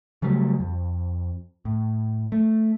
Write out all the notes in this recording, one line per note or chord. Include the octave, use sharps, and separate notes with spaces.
C#3 F#3 G3 A3
F2
A2
A3